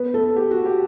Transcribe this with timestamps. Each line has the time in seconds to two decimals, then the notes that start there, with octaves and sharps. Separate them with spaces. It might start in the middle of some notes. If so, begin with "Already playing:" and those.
Already playing: B3 B4
0.14 A3 A4
0.36 G4
0.51 F#4
0.65 G4